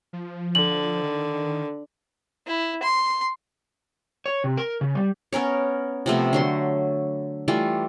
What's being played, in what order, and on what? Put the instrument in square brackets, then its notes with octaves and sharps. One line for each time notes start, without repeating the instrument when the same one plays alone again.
[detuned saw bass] F3
[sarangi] D3 [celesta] F#7
[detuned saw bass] D#3
[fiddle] E4
C6
[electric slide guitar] C#5
C3
A#4
C#3
G3
[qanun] B3 C#4 A#4 C#5
C3 F3 A3 B3
D3 F#3 C6
E3 G3 A3 F4